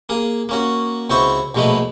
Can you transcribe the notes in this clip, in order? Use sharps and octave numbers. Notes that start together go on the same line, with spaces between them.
A#3 G#4
A#3 C#4 F#4
C#2 C4 E4 F#4 C5 C#6
A#1 B2 G#3 A3 B3 B5